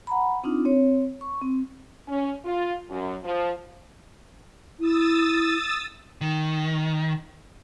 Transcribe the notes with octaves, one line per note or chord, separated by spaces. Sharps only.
F#5 A#5 B5
C4 D4 D#4 F4
C4 C#5
C#6
C4
C#4
F4
F#2
F3
E4 D#6 E6 A6
D#3